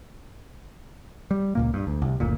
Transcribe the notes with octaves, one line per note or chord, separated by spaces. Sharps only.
G3
C#2 A#2 A#3
G2
D2
C2
F#1 D2 A#2